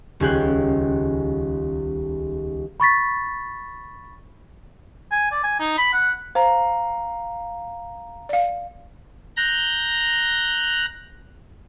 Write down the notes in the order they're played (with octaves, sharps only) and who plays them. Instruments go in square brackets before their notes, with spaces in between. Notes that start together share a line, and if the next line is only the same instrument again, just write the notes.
[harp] D#1 C#2 G#4 G5 F#6
[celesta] B5 C#6 A6 B6
[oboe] G#5
D5
G#5
D#4
B5
F#5
[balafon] C5 [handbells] F5 A#5
[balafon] D5 F5
[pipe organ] A#5 F#6 G6 A#6